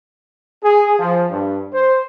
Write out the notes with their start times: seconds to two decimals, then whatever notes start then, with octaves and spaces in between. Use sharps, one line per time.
0.62 G#4
0.98 F3
1.30 G2
1.72 C5